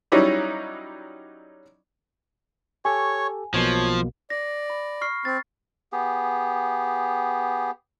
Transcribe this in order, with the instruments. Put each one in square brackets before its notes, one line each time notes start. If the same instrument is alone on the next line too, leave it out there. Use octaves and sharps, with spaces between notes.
[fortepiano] F#3 G3 C#4 D#4 E4 D5
[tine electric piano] G4 A4 [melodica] C#5 C#6 [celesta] G#5
[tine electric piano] B1 B2 A#3 [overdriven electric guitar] F3 [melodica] C#5
[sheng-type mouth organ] D5 [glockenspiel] A#6
[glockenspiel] B5
C#6 F6 C7
[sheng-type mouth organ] C4 [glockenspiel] A6
[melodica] B3 G4 G#4